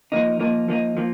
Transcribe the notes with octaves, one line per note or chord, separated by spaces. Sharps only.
F3 A#3 D#4
F3 A#3 D#4
F3 A#3 D#4
F3 A#3